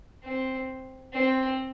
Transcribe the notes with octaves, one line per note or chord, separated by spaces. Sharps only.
C4
C4